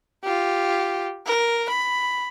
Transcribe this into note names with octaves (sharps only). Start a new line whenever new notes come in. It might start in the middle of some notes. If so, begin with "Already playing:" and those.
F4 G4
A#4
B5